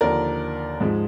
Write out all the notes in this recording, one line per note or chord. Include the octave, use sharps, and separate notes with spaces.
D#2 D3 F3 A#4 D5
G#2 F3 G#3